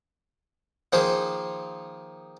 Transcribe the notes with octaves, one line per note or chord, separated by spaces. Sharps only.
D#3 F3 A#3 D#4 G#4 C5